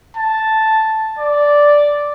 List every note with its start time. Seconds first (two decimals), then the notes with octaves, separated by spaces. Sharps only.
0.17 A5
1.19 D5